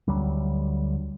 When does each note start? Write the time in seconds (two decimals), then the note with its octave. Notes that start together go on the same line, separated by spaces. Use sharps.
0.08 D2 F#3 G3